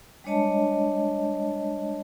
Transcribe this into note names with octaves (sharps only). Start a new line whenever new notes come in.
G3 G#3 D4 C#5 D#5 A5